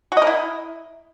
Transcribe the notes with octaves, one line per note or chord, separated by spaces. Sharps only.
F#4
D#5
A#4
E4